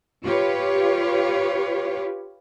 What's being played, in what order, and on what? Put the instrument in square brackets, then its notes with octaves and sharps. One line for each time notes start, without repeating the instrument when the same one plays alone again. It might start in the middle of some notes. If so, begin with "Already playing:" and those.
[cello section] F4 G4 B4 C#5